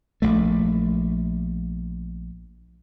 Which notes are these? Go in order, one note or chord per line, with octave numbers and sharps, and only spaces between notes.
A#1 A3